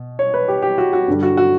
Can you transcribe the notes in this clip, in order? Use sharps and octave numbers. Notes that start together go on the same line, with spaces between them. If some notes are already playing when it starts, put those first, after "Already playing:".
Already playing: B2
C#5
B4
G4
G4
F#4
F#4
G2 D3 G3
F#4
F#4